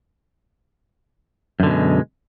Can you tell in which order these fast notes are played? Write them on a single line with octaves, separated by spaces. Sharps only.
F#2 D3 B2 G#3